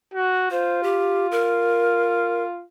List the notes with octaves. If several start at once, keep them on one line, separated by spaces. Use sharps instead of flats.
F#4
F4 C5
G4
A#4